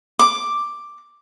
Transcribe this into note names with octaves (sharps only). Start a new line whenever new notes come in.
D6